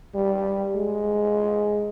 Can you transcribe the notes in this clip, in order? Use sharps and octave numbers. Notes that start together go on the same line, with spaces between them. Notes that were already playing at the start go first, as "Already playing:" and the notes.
G3
G#3